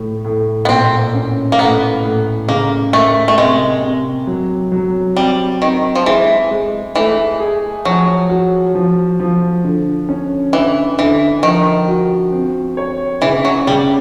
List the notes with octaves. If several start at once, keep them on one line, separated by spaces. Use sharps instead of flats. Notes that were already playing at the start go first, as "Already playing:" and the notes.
Already playing: A2
A2
B3
A#2 C4
C#4
A#3
A2 B3
A2
C#3 A#3
A3 A#3
A3
C3 G#3
C3
F#3
F#3
G3 C4
D#3 C4
F3
E3 G#3
G#3
E3 A3
G#4
F3 F#3
F#4
F3
F3
D3
C#4
D3 E3
D3 E3
D#3 F3
F#4
C4
C#5
C#3 E3
F#3
C#3 G3